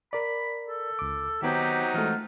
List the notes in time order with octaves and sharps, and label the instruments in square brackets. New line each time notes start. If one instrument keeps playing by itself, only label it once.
[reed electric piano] A#4 D5 [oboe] B5
[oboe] A4
[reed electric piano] C#2 D6
[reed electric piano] D#3 B3 [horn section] F#3 C4 D#4 [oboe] G4
[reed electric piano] E3 G#3 A3 [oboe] F4